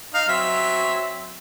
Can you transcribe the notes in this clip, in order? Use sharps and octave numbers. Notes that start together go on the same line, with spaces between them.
D#4 F5
F#3 C4 E5